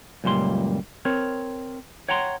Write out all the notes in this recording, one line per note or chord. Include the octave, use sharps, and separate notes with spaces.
C#2 F#2 A#2 G3 C6
C4 A#4 C#5
C#5 F#5 G5 A#5 C6